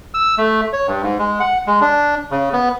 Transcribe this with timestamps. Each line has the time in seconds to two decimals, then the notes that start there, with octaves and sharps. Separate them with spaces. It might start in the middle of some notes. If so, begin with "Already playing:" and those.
0.14 E6
0.38 A3
0.73 C#5
0.87 G2
1.03 G#2
1.19 G#3
1.40 F#5
1.67 G#3
1.82 D4
2.31 C#3
2.53 B3